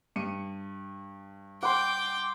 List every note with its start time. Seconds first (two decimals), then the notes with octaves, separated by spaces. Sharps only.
0.16 G2 C#7 D#7
1.63 F#5 G5 C6 D6